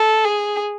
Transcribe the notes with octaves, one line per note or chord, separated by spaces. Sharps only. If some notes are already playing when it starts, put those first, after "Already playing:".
Already playing: A4
G#4